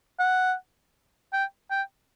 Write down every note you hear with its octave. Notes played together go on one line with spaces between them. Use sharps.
F#5
G5
G5